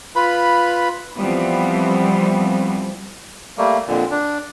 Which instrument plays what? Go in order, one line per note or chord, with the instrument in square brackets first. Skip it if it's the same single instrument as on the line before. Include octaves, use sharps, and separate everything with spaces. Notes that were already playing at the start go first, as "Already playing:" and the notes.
[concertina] F4 B4 B5
[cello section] E3 F3 G3 B3 C4
[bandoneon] G3 A3 A#3
F2 A#2 D3
D4